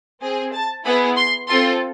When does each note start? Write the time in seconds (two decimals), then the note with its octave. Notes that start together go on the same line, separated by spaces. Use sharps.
0.21 C4 G#4
0.53 A5
0.85 B3 E4 G#4 B5
1.16 C6
1.47 C4 F4 A4 C6